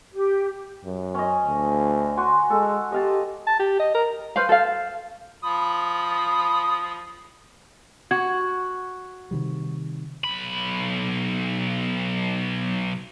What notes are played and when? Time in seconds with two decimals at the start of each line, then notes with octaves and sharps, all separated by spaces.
0.12 G4
0.85 F#2
1.14 C#4 D#5
1.45 D2
2.17 F#4 G#5 C6
2.50 G#3 A4
2.92 G4 D#5 F5 A5
3.47 A5
3.60 G4
3.79 D#5
3.95 A#4
4.36 B4 C5 F5
4.49 A4 F5
5.44 F3 B5 D#6
8.11 F#4 G#6
9.31 C3 D#3 G3
10.24 B1 B5